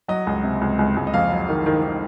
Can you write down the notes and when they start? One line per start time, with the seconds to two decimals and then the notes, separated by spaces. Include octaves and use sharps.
0.08 F#3 D#5
0.27 C#2
0.44 C3
0.61 C#2
0.79 C#2
0.97 C#2
1.07 D#5
1.13 F2 F5
1.31 F#3
1.49 D#3
1.66 D#3
1.83 D#3